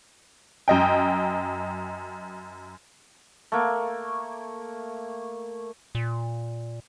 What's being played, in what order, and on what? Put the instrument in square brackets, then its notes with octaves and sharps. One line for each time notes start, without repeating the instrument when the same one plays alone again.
[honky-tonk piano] F#2 D#5 G5
[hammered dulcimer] A3 A#3
[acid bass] A#2